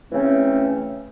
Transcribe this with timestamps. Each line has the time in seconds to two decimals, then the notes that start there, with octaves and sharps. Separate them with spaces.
0.12 C#3 E3 A3 C4 C#4